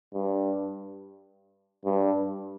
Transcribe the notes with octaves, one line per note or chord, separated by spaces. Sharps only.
G2
G2